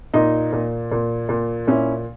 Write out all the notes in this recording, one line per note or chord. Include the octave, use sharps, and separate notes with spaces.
A#2 D#4
A#2
A#2
A#2
A#2 C#4 E4